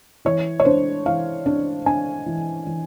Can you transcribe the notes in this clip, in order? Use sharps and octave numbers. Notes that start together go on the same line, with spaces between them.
E3 C#5
C#5
D4 C5
E3 F5
D4
D4 G#5
E3
E3